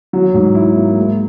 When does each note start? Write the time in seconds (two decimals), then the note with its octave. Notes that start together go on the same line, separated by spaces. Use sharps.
0.13 F#3
0.34 G#2
0.55 E4
0.76 A#3
0.97 G#3